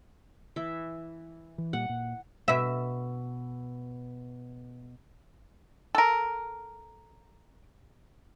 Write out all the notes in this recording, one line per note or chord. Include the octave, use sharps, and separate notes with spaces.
E3 E5
E3
A#2 G3 F#5
A#2
B2 E5
A4 A#4